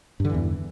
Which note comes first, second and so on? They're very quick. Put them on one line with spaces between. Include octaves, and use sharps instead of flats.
G2 D3 E3 E2